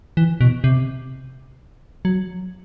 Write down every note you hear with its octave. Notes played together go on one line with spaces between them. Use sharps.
E3
B2
C3
F#3